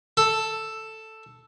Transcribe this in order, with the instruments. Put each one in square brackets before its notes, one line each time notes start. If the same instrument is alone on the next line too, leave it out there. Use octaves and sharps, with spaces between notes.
[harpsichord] A4